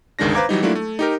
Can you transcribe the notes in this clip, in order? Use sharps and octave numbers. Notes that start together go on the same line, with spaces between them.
G1 C#2 D#3 G#3 D4 A#6
B4 C5 F5 A#5 D6 G#6
E3 F#3 G3 D#4
F#3 A3 A#3 D4 E4 F4
A3
D#4 G4 A#4